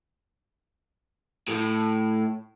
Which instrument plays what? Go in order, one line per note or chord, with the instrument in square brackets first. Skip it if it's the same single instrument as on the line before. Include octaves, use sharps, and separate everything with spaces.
[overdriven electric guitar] A2